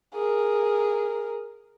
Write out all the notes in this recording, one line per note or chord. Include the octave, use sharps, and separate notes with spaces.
G#4 A#4